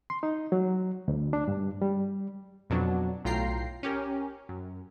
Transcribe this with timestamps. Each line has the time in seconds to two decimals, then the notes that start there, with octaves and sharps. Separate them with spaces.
0.10 C6
0.23 D#4
0.52 F#3
1.08 D2
1.33 D4
1.48 G2
1.82 G3
2.70 F2 B2 F#3 D4
3.25 B1 A2 F4 G5 A#5 C7
3.83 C#4 G4 A#4
4.49 F#2